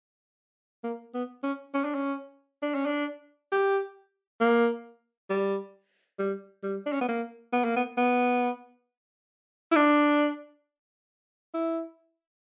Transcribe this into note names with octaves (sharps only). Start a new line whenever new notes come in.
A#3
B3
C#4
C#4
D4
C#4
D4
C#4
D4
G4
A#3
G3
G3
G3
D4
C#4
B3
A#3
B3
A#3
B3
B3
E4
D4
E4